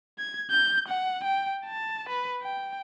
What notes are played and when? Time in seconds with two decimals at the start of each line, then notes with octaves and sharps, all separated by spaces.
0.19 G#6
0.50 G6
0.88 F#5
1.24 G5
1.66 A5
2.09 B4
2.42 G5